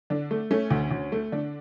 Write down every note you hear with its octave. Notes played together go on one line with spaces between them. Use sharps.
D3 D4
A3
A3 C#4
D2
D2
A3
D3 D4